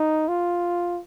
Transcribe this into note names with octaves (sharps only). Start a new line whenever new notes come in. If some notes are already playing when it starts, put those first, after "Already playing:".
Already playing: D#4
F4